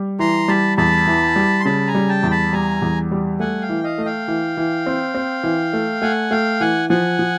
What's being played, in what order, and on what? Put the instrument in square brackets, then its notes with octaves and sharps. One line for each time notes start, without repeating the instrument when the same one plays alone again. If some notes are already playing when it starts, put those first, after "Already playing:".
Already playing: [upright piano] G3
[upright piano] E3 [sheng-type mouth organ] A#5 C6
[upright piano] G3 [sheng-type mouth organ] A5 B5
[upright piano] E2 [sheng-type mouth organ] A5 B5
[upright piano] E3
G3
[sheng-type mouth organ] C6
[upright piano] C#3 [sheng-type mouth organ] A5 B5
[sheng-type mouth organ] G#5 A#5
[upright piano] G3
[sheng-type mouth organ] G5 A5
[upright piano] E2
[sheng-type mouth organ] A5 B5
[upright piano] G3 [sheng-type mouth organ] G#5 A#5
[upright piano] E2
G3
[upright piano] A3 [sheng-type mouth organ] F#5 G#5
[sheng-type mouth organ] F5 G5
[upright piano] E3
[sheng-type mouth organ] D#5 F5
[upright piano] A3
[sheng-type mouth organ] F5 G5
[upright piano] E3
E3
C4
C4
E3
A3
[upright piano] A3 [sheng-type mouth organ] F#5 G#5
[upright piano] A3 [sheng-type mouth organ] F5 G5
[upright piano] E3 [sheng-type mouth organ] F#5 G#5
[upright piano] F3 [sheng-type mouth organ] F#5 G#5
[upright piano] F3